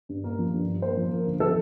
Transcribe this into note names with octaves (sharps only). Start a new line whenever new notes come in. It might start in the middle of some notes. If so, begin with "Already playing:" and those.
G2
A#3 A#4
F3
G2
G2
A#3 C5
F3
A#3
D2
F3 A4